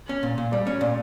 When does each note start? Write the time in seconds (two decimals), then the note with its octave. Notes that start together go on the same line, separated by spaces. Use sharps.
0.09 C#4
0.23 A#2
0.38 A#2
0.52 G3 D5
0.67 C#4
0.81 A#2 D5